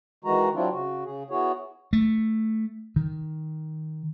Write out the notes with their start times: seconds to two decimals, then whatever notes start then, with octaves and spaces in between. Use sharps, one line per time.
0.24 D#3 E3 G#3 F#4 A#5
0.55 F#3 C4 D4 E4 F4
0.72 C#3 F#4
1.05 C#3 G#4
1.30 B3 E4 F#4 G#4 C#5
1.93 A3
2.96 D#3